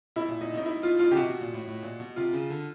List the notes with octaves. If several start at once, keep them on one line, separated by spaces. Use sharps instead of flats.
B2 E4
A#2
A#2 D#4
B2 D#4
E4
F4
F4
C#3 G4
C3 F#4
B2
A#2
A2
A2
A#2
B2
C3 F4
C#3
D3